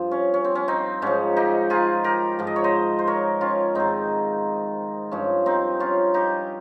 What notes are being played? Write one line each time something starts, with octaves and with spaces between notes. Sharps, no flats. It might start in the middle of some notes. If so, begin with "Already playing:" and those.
Already playing: G2 F3
C#4
C#4
C4
C#4
C4 D#4
G#2 F3 C#4
D#4 G4
F4 G#4
G4 A#4
G#2 F3
D#5
C#5
C5 D#5
C5
A#4 C#5
C#4 F4
G#2 D#3 C4 D#4
G2 F3 C#4
C4 D#4
C#4 F4
D#4 G4